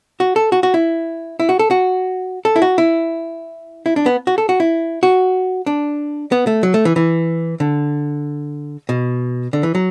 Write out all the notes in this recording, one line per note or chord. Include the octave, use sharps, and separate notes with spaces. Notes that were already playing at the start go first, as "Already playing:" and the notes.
F#4
A4
F#4
F#4
E4
E4
F#4
A4
F#4
A4
E4
F#4
E4
E4
D4
B3
F#4
A4
F#4
E4
F#4
D4
B3
A3
F#3
A3
E3
E3
D3
B2
D3
E3
F#3